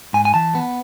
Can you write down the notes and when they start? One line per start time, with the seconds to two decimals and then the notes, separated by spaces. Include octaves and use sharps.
0.13 G#2 G#5
0.25 G#5
0.34 E3 A5
0.55 B3